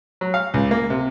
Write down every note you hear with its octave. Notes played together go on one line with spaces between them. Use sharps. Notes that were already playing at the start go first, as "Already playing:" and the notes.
F#3
F5
C#2
A#3
C3